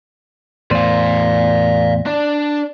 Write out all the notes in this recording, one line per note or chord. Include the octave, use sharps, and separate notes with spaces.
E2 A2 C5 D5 F5
D4 D5